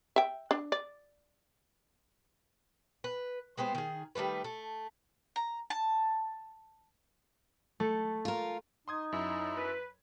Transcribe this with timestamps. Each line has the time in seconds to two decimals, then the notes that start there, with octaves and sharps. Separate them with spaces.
0.16 E5 G5
0.51 D4
0.72 D5
3.04 B4
3.58 G#3 B3 G4 C5
3.75 D#3 G#4
4.15 D#3 G3 A3 B4
4.44 A3
5.36 A#5
5.70 A5
7.80 A3 A4
8.25 F4 A#4
8.88 D#4 C6 D#6 G#6
9.13 F#2 E4
9.56 B4